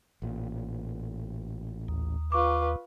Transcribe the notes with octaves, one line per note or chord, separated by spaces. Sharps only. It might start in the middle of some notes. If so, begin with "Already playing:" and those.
A1 A#2
D#2
F4 B4 C#6 D6